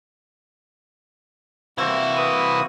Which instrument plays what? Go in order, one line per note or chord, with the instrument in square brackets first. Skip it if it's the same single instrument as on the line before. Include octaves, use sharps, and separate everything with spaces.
[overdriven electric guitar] C2 E4 [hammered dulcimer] E3 C4 [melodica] A#3 F#4
[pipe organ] B4 D#6